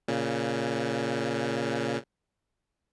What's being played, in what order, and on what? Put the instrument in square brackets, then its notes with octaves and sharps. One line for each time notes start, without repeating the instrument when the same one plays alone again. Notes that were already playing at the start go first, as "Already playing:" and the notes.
[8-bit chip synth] A#2 C#3